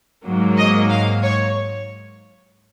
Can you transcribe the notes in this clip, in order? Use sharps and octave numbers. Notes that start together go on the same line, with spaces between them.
G#2 F#3 A#3
D#5
F5
C#5